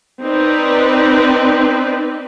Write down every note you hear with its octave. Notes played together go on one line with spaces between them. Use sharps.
C4 D#4 B4 D5